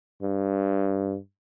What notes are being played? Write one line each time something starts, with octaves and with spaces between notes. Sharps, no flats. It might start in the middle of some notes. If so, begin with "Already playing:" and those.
G2